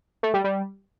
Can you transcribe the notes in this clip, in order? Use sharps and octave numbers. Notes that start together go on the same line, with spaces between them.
A3
G3
G3